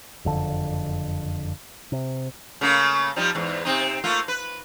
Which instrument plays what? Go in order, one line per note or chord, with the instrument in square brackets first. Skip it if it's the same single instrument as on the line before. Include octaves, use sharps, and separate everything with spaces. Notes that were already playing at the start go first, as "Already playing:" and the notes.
[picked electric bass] F#1 F2 D3
C3
[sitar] C#3 A3 A#3
F3 G3 D#4
E2 G#2
C3 C4 D#4
A3 A#3 F4
B4